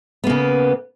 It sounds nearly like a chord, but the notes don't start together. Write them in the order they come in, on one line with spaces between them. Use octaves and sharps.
B3 A#3 C#3